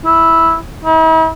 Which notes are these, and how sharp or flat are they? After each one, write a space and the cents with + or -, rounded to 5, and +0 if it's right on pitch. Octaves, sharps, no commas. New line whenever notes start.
E4 -5
E4 -45